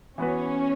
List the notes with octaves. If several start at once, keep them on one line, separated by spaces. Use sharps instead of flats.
E3 B3 C#4 F#4 B4